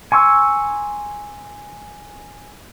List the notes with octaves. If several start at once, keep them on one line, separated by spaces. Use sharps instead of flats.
G#5 C6 C#6 E6